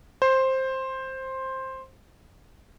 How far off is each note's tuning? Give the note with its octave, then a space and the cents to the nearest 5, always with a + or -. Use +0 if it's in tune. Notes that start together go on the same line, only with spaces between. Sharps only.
C5 +10